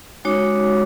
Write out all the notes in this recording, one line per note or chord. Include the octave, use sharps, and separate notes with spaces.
G#3 C#4 D#4 F#4 C#5 D6